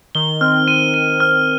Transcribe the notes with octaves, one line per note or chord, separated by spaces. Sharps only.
D#3 G7
C4 F6
C4 D#7
D#7
F6